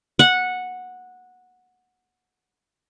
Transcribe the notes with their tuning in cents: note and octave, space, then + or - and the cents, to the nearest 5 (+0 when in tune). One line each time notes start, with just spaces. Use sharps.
F#5 -10